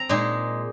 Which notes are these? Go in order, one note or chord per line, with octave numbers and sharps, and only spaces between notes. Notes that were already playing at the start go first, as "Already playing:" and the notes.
Already playing: C4 A#5
A#2 G#3 D#4